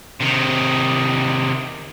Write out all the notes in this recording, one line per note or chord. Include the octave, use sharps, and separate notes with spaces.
C3 D#3